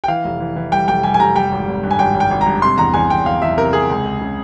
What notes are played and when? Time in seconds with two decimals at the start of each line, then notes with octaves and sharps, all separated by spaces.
0.04 G5
0.08 E3 F5
0.24 F1
0.40 E3
0.56 E3
0.72 G3 G5
0.88 F1 G5
1.03 G3 G#5
1.14 G#5
1.19 F1 A#5
1.36 G3 G5
1.52 G#1
1.68 G#1
1.84 G2
1.91 G#5
1.99 G#1 G5
2.15 G#1
2.20 G5
2.31 G#1
2.41 A#5
2.46 G2
2.62 C3 C6
2.78 E2 A#5
2.94 E2 G#5
3.10 E2 G5
3.26 E2 F5
3.42 E2 E5
3.57 C3 A#4
3.73 C3 G#4
3.90 C#2
4.05 C#2
4.21 C#3